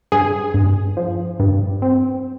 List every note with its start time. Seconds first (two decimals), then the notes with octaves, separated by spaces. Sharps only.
0.12 G2 G#4
0.54 G2
0.97 F3
1.40 G2
1.82 C4